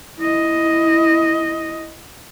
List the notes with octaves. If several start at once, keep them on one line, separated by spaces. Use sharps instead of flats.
E4 D#5